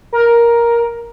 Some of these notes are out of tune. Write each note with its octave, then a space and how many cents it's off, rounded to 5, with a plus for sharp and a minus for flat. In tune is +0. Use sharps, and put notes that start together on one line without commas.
A#4 +10